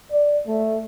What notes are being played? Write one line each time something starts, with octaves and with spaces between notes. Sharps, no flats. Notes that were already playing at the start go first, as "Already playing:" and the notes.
D5
A3